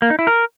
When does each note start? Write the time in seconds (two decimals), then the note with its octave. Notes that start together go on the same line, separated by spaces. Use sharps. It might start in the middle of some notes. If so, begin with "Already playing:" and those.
0.02 A#3
0.10 D#4
0.19 E4
0.27 A#4